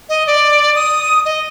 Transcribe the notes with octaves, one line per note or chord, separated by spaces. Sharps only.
D#5
D5
D#6
D#5